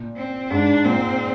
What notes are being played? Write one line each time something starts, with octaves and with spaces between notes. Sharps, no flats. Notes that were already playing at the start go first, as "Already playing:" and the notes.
Already playing: A#2
C4
G#2 D4
A#2 C4